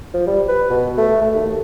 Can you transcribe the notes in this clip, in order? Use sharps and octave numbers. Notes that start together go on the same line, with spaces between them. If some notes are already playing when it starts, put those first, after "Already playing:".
F3
G3
B4
B2
A3
A3
D#2